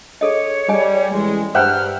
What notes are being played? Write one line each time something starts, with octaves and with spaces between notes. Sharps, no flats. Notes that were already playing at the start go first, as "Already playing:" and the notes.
G#4 A4 C#5 D#5
G3 G#4 D#5 G#5
A1 G#3
G2 B4 C5 E5 F#5 G5 A#5 F6